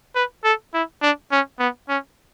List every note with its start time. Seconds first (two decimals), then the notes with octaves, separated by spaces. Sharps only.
0.15 B4
0.44 A4
0.74 E4
1.02 D4
1.32 C#4
1.59 B3
1.89 C#4